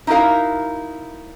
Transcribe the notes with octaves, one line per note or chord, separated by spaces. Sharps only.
D#4 E4 F#4 A#4 F5